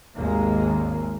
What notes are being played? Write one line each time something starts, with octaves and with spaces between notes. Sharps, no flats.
G#1 D#2 G#3 A#3